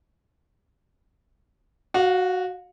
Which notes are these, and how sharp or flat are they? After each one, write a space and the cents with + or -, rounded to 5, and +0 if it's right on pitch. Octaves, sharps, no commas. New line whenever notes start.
F#4 +0 F5 +35